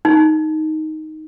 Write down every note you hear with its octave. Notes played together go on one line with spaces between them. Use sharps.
D#4